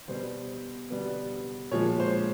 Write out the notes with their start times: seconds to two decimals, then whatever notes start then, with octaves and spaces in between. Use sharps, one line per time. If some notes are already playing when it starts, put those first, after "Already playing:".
0.08 B2 G3 B3 C5
0.90 B2 G3 B3
1.71 A#2 F3 G#3 C#5
2.00 C5